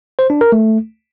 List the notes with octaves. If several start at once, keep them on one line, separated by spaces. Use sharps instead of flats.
C5
D4
A#4
A3